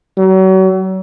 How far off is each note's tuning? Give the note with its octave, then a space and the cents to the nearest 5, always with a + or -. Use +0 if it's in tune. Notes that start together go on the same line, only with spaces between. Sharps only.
F#3 +35